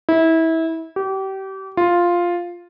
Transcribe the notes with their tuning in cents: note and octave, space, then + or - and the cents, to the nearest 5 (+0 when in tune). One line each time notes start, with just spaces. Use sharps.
E4 -25
G4 -30
F4 +0